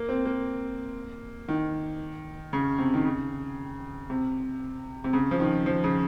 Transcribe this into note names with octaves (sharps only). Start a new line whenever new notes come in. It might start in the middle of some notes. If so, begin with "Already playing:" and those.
Already playing: A#3
C4
A#3
D#3
C#3
C3
D#3
C#3
C3
C3
C#3
F3
D#3
F3
C#3